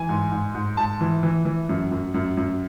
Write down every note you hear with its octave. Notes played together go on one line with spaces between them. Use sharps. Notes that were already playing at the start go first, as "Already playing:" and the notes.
Already playing: E3 G#5
G#2
G#2
G#2
G#2 A5
E3
E3
E3
F#2
F#2
F#2
F#2